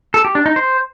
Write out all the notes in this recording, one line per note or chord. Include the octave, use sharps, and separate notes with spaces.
A4
G4
D4
D#4
C5